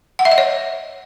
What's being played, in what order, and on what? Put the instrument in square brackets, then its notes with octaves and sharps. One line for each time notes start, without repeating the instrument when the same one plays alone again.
[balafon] F#5
E5
D#5
C#5